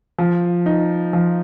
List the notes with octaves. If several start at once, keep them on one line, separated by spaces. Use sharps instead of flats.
F3
D#4
F3